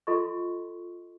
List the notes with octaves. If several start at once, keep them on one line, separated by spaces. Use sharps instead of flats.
F4 A4 D#5 A#5 C6 C#6